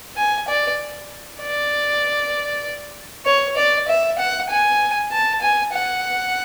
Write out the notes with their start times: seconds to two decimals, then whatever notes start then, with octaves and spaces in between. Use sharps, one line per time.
0.17 G#5
0.48 D5
1.41 D5
3.26 C#5
3.56 D5
3.88 E5
4.19 F#5
4.50 G#5
5.12 A5
5.41 G#5
5.73 F#5